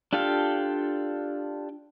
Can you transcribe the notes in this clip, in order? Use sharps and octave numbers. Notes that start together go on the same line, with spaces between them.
D4 F4 G4 A4 F5